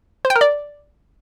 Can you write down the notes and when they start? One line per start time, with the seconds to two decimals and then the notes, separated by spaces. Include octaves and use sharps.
0.25 C5
0.30 G5
0.36 A#4
0.41 D5